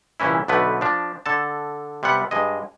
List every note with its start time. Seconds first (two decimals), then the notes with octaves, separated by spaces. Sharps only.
0.20 C2 A#2 E3 C#4 E4
0.48 B1 D3 A3 B3 B4
0.81 F3 D4
1.26 D3 A4 A5
2.03 C3 G3 B3 F#5
2.31 G2 G#3 D#5